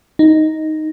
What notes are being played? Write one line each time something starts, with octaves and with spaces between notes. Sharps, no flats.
D#4